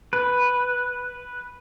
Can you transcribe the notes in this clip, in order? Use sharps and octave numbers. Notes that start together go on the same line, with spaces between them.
B4